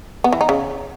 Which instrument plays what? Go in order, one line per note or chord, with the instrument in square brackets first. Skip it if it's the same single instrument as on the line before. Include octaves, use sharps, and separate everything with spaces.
[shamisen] B3
E3
D#4
C#3